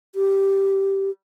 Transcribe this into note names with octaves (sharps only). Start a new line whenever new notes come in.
G4